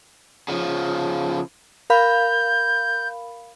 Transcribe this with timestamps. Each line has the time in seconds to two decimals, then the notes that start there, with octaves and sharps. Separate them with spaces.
0.48 C#3 F3
1.90 A#4 F5 B5 G6